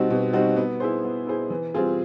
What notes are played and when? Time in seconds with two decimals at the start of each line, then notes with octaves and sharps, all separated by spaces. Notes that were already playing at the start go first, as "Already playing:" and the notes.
Already playing: B2 G3 C4 D#4 F#4
0.10 B2
0.33 G3 C4 D#4 F#4
0.57 B3
0.80 E4 G#4 C5
1.04 B3
1.27 E4 G#4 C5
1.50 E3
1.74 G3 C4 F4 G#4